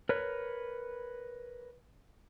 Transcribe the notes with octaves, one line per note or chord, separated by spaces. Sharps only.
A#4 B4 C#5